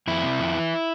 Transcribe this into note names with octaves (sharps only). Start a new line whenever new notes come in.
F2 E4
C3
F2
E3